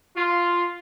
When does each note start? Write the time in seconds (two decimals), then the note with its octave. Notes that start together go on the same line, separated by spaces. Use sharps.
0.16 F4